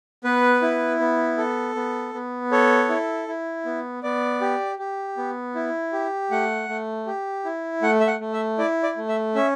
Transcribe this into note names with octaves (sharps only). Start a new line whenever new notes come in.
B3 B4
E4
B3
A4
B3
B3
A4 C#5
E4
E4
B3
B3 D5
G4
G4
B3
E4
G4
A3 F#5
A3
G4
E4
A3 F#5
E5
F#5
A3
E5
E4 D5
D5
A3
E5
C#4 E5